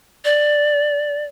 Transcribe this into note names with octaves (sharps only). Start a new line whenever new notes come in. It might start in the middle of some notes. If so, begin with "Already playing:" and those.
D5